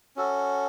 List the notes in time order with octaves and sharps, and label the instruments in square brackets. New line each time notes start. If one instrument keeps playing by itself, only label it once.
[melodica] C#4 F#4 A4